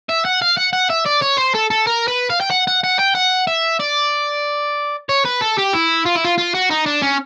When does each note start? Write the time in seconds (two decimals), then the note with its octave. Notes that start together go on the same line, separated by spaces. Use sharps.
0.09 E5
0.25 F#5
0.42 F5
0.57 F#5
0.73 F#5
0.90 E5
1.06 D5
1.22 C#5
1.38 C5
1.55 A4
1.70 A4
1.87 A#4
2.07 B4
2.30 F5
2.40 G5
2.50 F#5
2.67 F#5
2.84 F#5
2.99 G5
3.15 F#5
3.47 E5
3.79 D5
5.09 C#5
5.25 B4
5.41 A4
5.58 G4
5.73 E4
6.05 F4
6.15 E4
6.24 F4
6.38 F4
6.55 F#4
6.71 D#4
6.86 D4
7.02 C#4